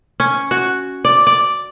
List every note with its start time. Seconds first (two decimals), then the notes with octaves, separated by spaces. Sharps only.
0.20 C#4
0.51 F#4
1.05 D5
1.27 D5